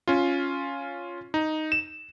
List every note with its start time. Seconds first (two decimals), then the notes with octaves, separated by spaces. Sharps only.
0.08 C#4 F4
1.34 D#4
1.72 E7